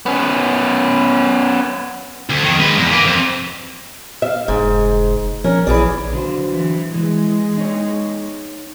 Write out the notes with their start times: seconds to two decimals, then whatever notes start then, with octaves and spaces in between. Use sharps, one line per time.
0.06 B3 C#4
2.30 D2
2.43 F2 D#3
2.59 G#3 B4
2.78 E2
2.91 A#3 B4
3.05 F2
4.22 E5 F5
4.48 F1 G#2
5.44 F3 C#4 A#4
5.67 A#1 E3 G#4 D5
6.13 D3 F#3 C5
6.48 E3
6.95 E3 G#3
7.58 D#4 C#5